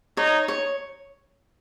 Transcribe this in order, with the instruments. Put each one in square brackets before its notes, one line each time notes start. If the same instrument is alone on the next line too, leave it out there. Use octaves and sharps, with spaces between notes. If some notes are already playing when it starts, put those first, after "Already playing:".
[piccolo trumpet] D#4 [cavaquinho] C#5
[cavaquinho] C#5